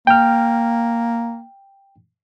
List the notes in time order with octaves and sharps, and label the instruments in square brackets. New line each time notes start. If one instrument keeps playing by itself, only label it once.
[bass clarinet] A#3 [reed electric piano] G5 F6